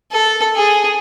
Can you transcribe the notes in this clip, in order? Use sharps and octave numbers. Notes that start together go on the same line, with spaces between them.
A4
G#4